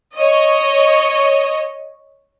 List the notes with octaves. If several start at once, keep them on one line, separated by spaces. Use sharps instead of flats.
C#5 D#5